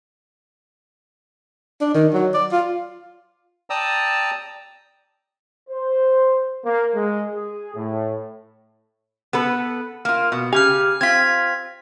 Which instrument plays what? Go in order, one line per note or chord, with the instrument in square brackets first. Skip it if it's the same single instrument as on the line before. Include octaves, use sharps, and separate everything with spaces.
[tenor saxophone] D4
D#3
F#3
D5
F4
[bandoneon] D5 G5 A5 A#5 D#6 E6
[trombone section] C5
A#3
G#3
G#4
A2
[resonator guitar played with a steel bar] B3 A4 B4
A#3 F4
B2
[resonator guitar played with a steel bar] C#3 G#5 [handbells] G4 F6
[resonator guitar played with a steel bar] C4 F4 [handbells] G#6 B6